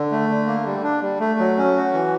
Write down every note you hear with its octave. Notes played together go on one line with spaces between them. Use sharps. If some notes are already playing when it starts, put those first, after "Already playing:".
Already playing: D3
A3
D3
A#3
G3
D4
G3
A3
F#3
C#4
F#4
E3